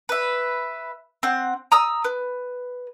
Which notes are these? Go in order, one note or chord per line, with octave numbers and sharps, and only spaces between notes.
B4 E5
C4 F#5
A#5 D#6 E6
B4